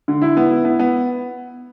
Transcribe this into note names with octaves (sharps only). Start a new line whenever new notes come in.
D3
E4
B3
E4
B3
B3